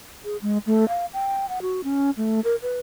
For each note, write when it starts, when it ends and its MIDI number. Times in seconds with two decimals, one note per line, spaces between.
0.24 0.37 68
0.42 0.58 56
0.66 0.88 57
0.88 1.06 77
1.13 1.48 79
1.49 1.59 78
1.62 1.81 66
1.84 2.11 61
2.17 2.40 57
2.44 2.56 70
2.62 2.80 71